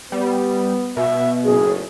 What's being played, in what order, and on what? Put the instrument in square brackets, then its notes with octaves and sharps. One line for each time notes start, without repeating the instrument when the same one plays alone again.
[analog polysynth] G3 [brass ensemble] B3
[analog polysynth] B2 [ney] E5
[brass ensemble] F#1 B1 A2 [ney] G#4